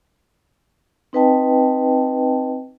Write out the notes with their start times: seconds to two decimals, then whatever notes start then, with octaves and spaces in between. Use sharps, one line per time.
1.13 C4 D#4 B4 D#5 G5 A5